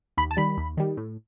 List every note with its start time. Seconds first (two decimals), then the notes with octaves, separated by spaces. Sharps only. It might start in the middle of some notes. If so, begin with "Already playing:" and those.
0.17 D#2 B5
0.31 A5
0.37 D#3 G3 B5
0.57 D#2
0.77 D#3 G3
0.97 A2